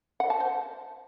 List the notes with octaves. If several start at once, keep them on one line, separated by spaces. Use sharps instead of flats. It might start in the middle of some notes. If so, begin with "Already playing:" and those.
F#5
A5
C5